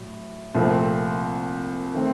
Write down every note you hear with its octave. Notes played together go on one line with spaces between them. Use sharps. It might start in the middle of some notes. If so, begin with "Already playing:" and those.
Already playing: A2 F#3
C2 A#2 F3 A3 C4
D#3 A3 C4